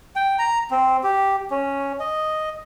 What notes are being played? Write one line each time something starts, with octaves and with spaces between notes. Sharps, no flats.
G5
A#5
C4
G4
C#4
D#5